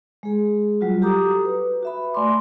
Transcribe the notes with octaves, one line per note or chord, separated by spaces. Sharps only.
G#3 G#4
F#3 G3 F4 F#4
F#4 G4 A4 A#5 D6 D#6
B4
F#4 E5 B5
A3 D5 G#5 B5 C6 D6